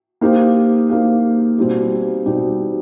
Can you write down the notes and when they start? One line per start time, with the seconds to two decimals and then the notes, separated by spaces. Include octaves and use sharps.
0.21 A#3 D#4 G4 C5 F5
0.89 A#3 D#4 G4 C5 F5
1.58 B2 G3 C4 D#4 G4
2.25 B2 G3 C4 D#4 G4